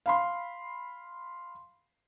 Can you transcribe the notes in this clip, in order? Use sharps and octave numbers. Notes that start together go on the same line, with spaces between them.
F5 B5 C6